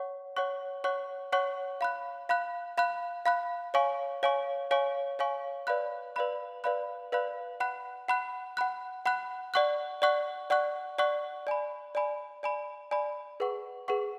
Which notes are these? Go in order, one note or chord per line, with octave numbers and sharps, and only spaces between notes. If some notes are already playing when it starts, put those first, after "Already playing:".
Already playing: C#5 F#5 C#6
C#5 F#5 C#6 F#6
C#5 F#5 C#6 F#6
C#5 F#5 C#6 F#6
F5 B5 F#6
F5 B5 F#6
F5 B5 F#6
F5 B5 F#6
C#5 F5 G#5 C#6
C#5 F5 G#5 C#6
C#5 F5 G#5 C#6
C#5 F5 G#5 C#6
B4 D5 F5 B5 F#6
B4 D5 F5 B5 F#6
B4 D5 F5 B5 F#6
B4 D5 F5 B5 F#6
F#5 B5 F#6
F#5 B5 F#6
F#5 B5 F#6
F#5 B5 F#6
D5 F#5 C#6 F#6
D5 F#5 C#6 F#6
D5 F#5 C#6 F#6
D5 F#5 C#6 F#6
D5 G#5 B5
D5 G#5 B5
D5 G#5 B5
D5 G#5 B5
G#4 B4 F#5 C#6
G#4 B4 F#5 C#6